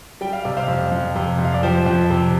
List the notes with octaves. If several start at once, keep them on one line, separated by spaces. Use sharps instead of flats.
G3 G5
F5
C3 D5
C5 F5
F2
F2
C3
F2
F5
D5
F3 G4 C5
F2
C3